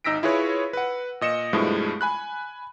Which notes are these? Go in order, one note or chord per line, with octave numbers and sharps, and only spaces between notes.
G#1 D#4 E6 A#6 B6 D7
E4 F4 G#4 B4 C#5
B4 F#5
A#2 D#5 C#7 E7
G2 B2 F3 G#3 A3 E4
G#5 B5 F#6